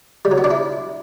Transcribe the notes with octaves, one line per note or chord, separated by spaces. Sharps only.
G3
F#3
B3
D4
E4